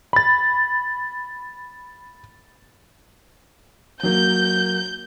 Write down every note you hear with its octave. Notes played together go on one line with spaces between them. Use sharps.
B5 A6
F#3 A#3 G6